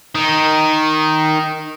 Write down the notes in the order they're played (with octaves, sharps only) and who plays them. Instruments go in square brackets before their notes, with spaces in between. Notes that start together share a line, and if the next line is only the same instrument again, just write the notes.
[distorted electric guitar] D#3